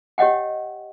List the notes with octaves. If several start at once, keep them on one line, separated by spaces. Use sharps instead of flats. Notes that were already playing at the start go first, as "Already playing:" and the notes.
G4 C#5 D#5 F#5 G5